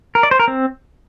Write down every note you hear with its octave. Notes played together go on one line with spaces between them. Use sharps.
A#4
D5
C5
A#4
C4